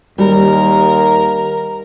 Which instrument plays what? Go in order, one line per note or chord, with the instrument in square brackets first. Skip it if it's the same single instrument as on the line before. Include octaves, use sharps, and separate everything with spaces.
[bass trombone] D#2 [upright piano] G3 [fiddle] A#4